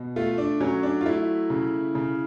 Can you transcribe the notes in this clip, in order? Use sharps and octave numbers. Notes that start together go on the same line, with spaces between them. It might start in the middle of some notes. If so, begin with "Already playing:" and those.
Already playing: B2
A3 F4
D4
F#3 C#4
D4
F4
A3 E4
C#3
C#3